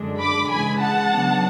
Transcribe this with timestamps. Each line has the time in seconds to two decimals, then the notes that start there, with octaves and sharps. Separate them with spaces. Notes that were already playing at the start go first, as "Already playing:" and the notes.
Already playing: F#2 D3 G#3 D4
0.20 B5 D6
0.50 C#3 E3 G#3 G#5 B5
0.81 F#5 A5
1.11 C#3 F#3 B3 D4